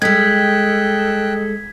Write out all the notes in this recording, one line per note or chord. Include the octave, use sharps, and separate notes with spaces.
G3 G#3 A4 D#5 G5 F#6 G#6 B6